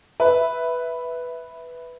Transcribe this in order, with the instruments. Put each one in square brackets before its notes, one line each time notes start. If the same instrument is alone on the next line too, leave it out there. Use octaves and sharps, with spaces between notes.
[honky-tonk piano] B4 E5